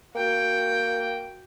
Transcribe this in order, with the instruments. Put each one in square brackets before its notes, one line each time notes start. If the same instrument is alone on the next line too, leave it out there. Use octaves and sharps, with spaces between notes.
[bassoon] A#3 [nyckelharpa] F#4 G5